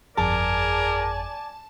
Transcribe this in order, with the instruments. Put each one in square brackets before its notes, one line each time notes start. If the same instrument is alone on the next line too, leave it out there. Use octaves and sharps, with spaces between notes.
[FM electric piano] G1 F2 G#4 [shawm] A#4 [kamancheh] D5 G#5 [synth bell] A5